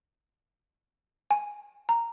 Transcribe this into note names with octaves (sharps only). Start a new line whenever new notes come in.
G#5
A#5